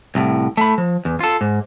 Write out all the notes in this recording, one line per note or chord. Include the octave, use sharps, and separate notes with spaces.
C2 A2
A3 B5
F3
E2
F4 A4
G#2